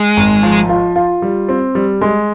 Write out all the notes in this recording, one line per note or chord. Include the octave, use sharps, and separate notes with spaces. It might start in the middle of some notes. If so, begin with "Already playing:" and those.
Already playing: G#3
G#1
F3
F4
F4
G3
C4
G3
G#3